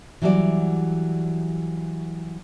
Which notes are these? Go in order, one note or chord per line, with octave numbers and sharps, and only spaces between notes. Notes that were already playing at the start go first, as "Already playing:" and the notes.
E3 F#3 G3 F#4 D5